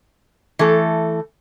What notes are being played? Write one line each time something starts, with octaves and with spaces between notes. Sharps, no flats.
E3 A3 A4